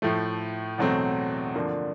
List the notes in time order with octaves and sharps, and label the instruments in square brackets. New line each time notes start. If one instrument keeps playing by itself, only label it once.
[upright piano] A2 F3 A3
E2 B2 F#3 A3 C4
G2 D3 F3 A#3 D4